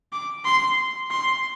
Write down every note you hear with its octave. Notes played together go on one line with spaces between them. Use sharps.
D6
C6
C6